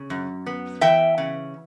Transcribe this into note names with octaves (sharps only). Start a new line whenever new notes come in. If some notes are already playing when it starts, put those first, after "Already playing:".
Already playing: C#3
F#2
B3
E3 E5 G5
C#3